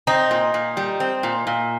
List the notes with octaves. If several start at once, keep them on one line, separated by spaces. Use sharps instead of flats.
C4 D#4
A#2
A#2
G3
C4
A#2
A#2